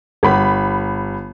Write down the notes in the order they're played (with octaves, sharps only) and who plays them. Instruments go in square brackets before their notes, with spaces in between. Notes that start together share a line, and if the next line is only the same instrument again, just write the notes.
[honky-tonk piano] G1 B5